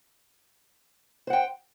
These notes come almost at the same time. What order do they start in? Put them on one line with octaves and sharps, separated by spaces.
C5 F#5 G5